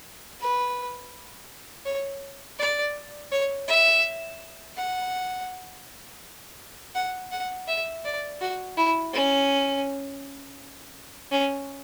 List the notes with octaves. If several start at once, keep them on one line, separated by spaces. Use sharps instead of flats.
B4
C#5
D5
C#5
E5
F#5
F#5
F#5
E5
D5
F#4
E4
C#4
C#4